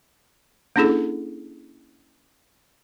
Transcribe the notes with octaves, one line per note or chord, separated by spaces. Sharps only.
A#3 C#4 D4 E4 G#4 A4